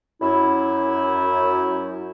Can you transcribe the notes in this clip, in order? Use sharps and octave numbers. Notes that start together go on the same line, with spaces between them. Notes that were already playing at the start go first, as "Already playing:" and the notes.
F#2 E4